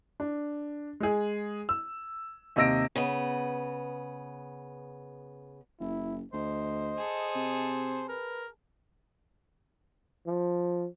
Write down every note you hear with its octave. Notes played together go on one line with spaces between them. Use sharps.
D4
G#3 G#4
E6
D#2 C3 D#5 E6 A#6 D7
C#3 B3
F#1 E4
D2 C5 D#5
G#4 A4
C3
A#4 B4
F3